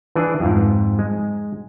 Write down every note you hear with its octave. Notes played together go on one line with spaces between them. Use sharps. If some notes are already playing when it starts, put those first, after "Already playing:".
E3 D4 G#4
F2 G#2
G#3